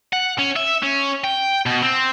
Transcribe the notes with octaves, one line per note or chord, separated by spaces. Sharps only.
F#5
C#4
E5
C#4
G5
B2
C4